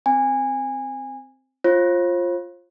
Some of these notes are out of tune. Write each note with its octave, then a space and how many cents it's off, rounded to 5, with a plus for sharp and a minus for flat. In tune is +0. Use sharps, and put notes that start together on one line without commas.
C4 +0 G#5 -20
F4 +0 C5 +40